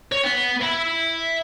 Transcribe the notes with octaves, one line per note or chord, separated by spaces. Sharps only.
C#5
B3
E5 B5